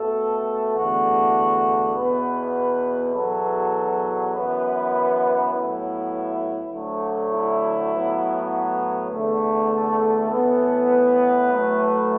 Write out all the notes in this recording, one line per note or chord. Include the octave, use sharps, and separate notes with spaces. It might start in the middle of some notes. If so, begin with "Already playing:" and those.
Already playing: B2 A3 A4
E2 D3 A3 F#4
E2 B2 B3 B4
E2 B2 F#3 A4
F#2 E3 B3 B4
A2 F#3 B3 E4
D2 D3 F#3 A3
E4
A2 F#3 B3
E2 D3 A3
A4
A2 E3 B3
B4
A2 F#3 A3